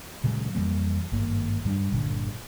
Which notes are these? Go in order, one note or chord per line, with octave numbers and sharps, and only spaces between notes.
A#2 C#3 F#3 G#3
F2 E3 G3 A#3
G#1 G2 A#3
G2 G3 C4 D4
G1 A#2 D3